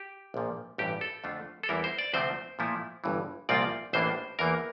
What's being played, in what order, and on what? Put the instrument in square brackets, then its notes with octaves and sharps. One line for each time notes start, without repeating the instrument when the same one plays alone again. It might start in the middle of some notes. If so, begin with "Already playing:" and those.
Already playing: [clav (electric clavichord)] G4
A#1 A#2 F3
A1 G2 E3 G4
A4
F2 D3 A3 D4 F4
A4
E2 E3 G3 C4 E4 A#4
C5
D5
D2 C3 F3 A3 C4 C5
A#2 F3 A3 E4
G1 G2 E3
C2 A#2 F3 C4 F4 D5
A1 A2 E3 A#3 D4 C5
E2 E3 A#3 A#4